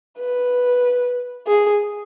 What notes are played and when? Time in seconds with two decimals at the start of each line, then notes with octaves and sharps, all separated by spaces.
0.19 B4
1.47 G#4